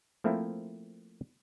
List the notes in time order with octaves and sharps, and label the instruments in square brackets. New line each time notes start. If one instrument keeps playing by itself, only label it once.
[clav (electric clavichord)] F3 A3 A#3 C4 E4